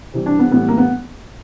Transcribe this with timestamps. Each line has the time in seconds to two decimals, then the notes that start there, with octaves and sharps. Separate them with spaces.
0.13 C3 E3 G3
0.26 D4
0.39 B3
0.51 A2 E3 G3 B3
0.68 A#3
0.77 B3